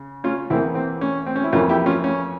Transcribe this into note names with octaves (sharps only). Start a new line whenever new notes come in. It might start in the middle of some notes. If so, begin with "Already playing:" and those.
Already playing: C#3
C#4 F4
E2 E3 A#3 C4 E4
C4
C#4
C4
C#4
E4
F2 E3 A#3 C#4 F4
E4 G4
C#4 F4
C#4